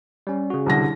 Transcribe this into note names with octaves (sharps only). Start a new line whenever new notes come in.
G3 C#4
C#3 F#4
C2 D3 A#6